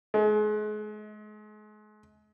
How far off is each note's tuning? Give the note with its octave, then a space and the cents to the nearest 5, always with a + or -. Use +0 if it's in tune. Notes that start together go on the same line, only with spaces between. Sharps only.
G#3 +35